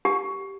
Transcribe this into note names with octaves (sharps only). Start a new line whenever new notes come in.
G4